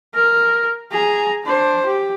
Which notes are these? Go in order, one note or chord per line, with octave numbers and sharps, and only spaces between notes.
A#4
G#4 A#5
D4 C5
G4